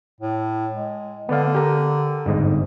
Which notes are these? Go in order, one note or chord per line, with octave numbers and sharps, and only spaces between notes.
A2
G#3
D3 B3 D5 F5
G4 A#4
G1 F2 G#2 D#5